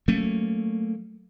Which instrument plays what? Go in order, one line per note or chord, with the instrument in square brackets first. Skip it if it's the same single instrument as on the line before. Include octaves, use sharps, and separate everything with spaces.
[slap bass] F#3 A3 A#3 C#4